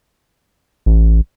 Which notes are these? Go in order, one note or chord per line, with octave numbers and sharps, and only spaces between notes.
A1